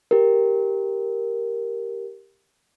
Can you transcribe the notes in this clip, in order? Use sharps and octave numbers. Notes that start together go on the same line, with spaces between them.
G4 A#4